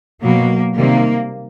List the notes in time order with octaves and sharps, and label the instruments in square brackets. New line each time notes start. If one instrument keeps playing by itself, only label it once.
[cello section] B2 F#3 A#3
C3 D#3 G3 A#3